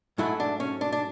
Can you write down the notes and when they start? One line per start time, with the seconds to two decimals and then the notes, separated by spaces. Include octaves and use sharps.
0.18 G#2 F#3 A3 E4
0.40 D4
0.60 C#4
0.81 D4
0.92 D4